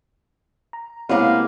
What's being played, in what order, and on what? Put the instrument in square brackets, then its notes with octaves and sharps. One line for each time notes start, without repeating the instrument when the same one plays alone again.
[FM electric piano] A#5
[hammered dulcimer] C3 A#3 [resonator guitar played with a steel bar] G#3 B3 [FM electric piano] E4 C#5 D#5 [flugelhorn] F5